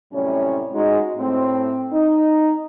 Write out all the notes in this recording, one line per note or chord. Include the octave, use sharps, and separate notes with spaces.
F#2 A2 C3 G3 C#4 C#5
G#3 D#4 F#4
A2 C4
D#4